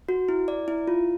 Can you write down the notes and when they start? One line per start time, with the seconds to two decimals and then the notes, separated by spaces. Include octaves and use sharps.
0.09 F#4
0.29 E4
0.48 D5
0.68 E4
0.88 F4